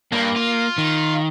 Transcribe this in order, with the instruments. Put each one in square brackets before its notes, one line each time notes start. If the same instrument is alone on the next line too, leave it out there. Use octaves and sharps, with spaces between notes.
[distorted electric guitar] G2 [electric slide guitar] A#3
[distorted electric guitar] F4
[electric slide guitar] D#3